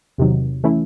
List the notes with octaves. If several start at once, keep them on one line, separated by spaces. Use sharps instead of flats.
E2 C3 D#3 F#3
E3 A3 C#4 E4